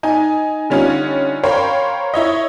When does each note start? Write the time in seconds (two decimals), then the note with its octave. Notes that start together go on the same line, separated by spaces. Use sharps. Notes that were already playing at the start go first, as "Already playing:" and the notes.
0.03 D#4 G#5
0.70 D3 G3 C#4 D#4 F4
1.43 A#4 C5 C#5 F5 G5 B5
2.14 E4 C#5 D#5